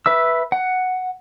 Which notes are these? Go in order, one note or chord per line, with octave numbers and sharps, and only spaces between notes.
B4 E5 E6
F#5